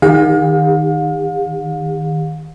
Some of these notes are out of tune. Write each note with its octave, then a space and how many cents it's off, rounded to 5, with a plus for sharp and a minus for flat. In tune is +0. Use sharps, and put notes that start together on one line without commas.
D#3 +0 G4 +40 F5 +40